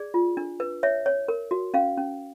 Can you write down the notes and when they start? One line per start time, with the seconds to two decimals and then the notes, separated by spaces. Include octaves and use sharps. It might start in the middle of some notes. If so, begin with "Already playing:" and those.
Already playing: G#4 D5
0.14 F4
0.37 D4
0.60 B4
0.83 C#5 E5
1.06 C#5
1.28 A#4
1.51 F#4
1.74 C#4 F5
1.98 C#4